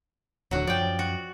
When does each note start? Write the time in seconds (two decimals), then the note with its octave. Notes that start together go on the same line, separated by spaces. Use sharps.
0.51 D1 D3 F#3 F#4
0.67 F#2 F3 D5 G5
0.99 F#4